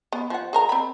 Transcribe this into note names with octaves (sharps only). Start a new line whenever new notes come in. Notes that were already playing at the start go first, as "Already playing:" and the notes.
B3
F3 F#5
G#4 A#4 A#5
C4 B5